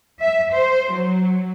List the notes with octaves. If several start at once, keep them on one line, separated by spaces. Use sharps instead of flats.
E5
C5
F#3